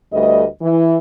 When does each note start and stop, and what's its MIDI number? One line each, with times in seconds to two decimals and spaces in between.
0.12 0.46 38
0.12 0.46 55
0.12 0.46 57
0.12 0.46 71
0.12 0.46 75
0.62 0.97 52